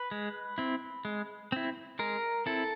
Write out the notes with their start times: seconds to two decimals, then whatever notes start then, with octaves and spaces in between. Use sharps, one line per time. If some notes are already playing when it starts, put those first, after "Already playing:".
Already playing: B4
0.11 G#3
0.58 C4 E4
1.05 G#3
1.52 C4 E4
1.99 G#3 A#4
2.46 C4 E4 A4